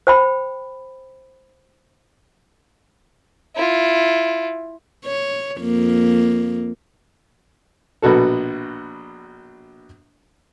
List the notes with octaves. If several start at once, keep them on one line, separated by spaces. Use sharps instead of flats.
C5 G5 B5
E4 F4
C#5
F2 A#3
A#1 B2 F#4 A4